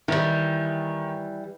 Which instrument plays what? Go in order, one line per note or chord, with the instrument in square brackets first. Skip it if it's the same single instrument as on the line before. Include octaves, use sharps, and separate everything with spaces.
[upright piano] D#3 [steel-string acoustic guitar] E3 G3